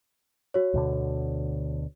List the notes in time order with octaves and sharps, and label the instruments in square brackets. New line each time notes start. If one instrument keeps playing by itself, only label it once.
[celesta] F#4 C#5
[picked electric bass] D2 B2 D3